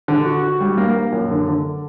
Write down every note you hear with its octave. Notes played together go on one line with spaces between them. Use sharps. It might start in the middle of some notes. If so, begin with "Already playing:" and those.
D3
F#4
F#4
G3
A#3
A#3
F#2
D3
D3